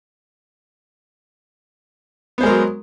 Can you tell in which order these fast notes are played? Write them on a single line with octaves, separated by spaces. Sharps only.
B3 C5 G#3 A#4 F#3